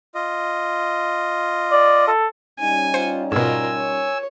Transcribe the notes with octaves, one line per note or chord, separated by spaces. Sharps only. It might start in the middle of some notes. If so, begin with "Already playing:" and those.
F4 D#5
D5
A4
G3 C#4 D#4 G#5
F4 C5 C#7 D#7
G#2 B2 F4 A#4 G#5 E6
C#5